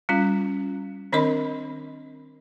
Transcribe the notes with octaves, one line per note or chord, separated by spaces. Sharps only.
G3 C#4 F4
D#3 C4 D4 A#4 D#5 B5